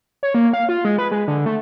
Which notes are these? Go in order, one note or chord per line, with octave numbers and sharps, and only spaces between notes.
C#5
A#3
F5
F4
G#3
B4
G#3
D3
A3